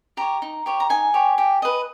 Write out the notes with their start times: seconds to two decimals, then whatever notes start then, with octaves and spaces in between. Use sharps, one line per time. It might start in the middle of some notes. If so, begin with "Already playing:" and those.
0.17 G4 C#5 A#5
0.42 D#4
0.66 G4 C#5
0.80 A#5
0.89 D#4 G#5
1.14 G4 C#5
1.38 G4
1.62 B4 D#5